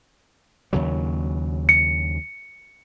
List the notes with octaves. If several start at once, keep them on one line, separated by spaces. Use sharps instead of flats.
D#2 C#3 F#3
C#7